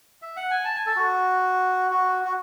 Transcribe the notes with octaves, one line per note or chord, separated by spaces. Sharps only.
E5
F#5
G#5
A5
G#5
A4
F#4
F#4
F#4